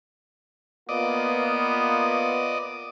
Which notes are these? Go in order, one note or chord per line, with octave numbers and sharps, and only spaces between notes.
A#3 B3 F4 D5 D#5